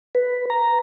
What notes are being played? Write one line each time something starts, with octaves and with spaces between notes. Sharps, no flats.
B4
A#5